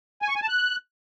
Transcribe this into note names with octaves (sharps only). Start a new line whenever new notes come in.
G#5
C#6
G#5
A5
F#6